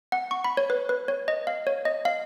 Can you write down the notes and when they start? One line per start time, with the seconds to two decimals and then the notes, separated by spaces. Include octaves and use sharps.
0.12 F#5
0.31 C#6
0.44 B5
0.57 C#5
0.70 B4
0.89 B4
1.08 C#5
1.28 D#5
1.47 F5
1.67 C#5
1.85 D#5
2.05 F5